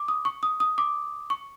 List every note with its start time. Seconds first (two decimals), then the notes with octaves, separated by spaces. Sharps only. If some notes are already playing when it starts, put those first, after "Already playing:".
Already playing: D6
0.08 D#6
0.25 C#6
0.43 D#6
0.60 D#6
0.78 D6
1.30 C#6